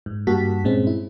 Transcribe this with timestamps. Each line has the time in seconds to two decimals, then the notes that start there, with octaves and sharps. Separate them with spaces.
0.06 G#2
0.27 G2 A#3 F#4 G4 A5 B6
0.64 G2 A#2 G#3 C4 C#4
0.87 E4